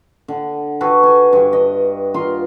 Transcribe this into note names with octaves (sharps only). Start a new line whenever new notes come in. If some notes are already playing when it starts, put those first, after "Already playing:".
D3 F#5
F#4 G#4 A4 B4
G#5
G2 G4
D#5
F4 A#4 C6